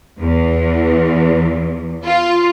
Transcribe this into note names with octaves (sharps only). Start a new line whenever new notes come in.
E2
F4